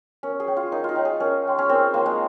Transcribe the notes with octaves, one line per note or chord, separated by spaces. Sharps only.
C#4 A#4
G#4
C#5 G5
F4
D#4 A#4
D#4 F4
C#5 G5
G#4
C#4 A#4
C#5 G5 C6
C#4
C4 A#4
A#3 C#5 G5 C6
G#3